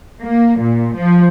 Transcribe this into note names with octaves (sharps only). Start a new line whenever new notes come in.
A#3
A#2
F3